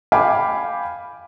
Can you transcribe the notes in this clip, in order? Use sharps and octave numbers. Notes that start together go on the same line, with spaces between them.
F5 G5 G#5 B5 D6